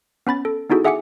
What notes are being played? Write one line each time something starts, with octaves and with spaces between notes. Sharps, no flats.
B3 C#4 B5 A6
A4
B3 D#4 E4 F#4 G#4 A4
G#4 E5 F#5 G#5 D6 C#7